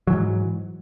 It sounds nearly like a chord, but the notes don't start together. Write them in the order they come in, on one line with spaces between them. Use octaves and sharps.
F#3 E3 G#2